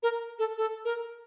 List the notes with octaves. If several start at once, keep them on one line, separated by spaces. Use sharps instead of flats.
A#4
A4
A4
A#4